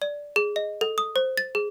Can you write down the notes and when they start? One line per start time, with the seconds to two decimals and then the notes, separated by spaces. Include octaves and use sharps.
0.02 D5
0.36 G#4
0.56 D#5
0.81 A4
0.98 D#6
1.16 C5
1.37 A6
1.55 G#4